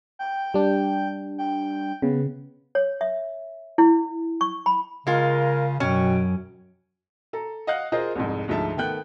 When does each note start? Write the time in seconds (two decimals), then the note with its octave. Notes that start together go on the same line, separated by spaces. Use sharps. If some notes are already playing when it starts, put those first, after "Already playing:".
0.19 G5
0.54 G3 D4
1.38 G5
2.02 C#3 B3
2.75 C#5
3.01 E5
3.78 E4
4.41 C#6
4.66 B5
5.07 C#3 G#3 F4 A#4
5.80 F#2 B2 C#4 G5
7.33 A4 A#5
7.67 D#5 F5 F#5 F#6
7.92 F4 G#4 A#4 C5 D#5
8.15 C2 F2 G#2
8.48 D2 G#2 F3 E5 A5
8.77 D#3 A3 B3 G5 F#6